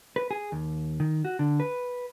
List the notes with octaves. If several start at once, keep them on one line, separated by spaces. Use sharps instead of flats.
B4
G#4
D#2
D#3
F#4
D3
B4